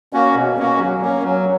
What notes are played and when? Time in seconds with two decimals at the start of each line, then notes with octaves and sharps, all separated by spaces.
0.13 A#3 C#4 F#4
0.35 B2
0.58 A#3 C#4 F#4
0.79 F#3
1.02 A#3 C#4
1.23 F#3